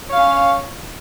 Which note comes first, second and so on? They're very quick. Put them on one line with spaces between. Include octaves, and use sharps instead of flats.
C#5 F5 C#4